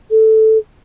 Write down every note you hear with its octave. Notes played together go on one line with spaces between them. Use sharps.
A4